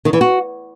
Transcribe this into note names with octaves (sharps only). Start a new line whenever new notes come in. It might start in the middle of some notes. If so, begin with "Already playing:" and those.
D#3
E3
F#4